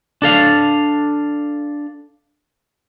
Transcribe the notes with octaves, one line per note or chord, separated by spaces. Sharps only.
D4 A4 F5